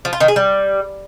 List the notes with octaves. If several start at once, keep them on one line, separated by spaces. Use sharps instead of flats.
F3
F4
D#3
G#4
G3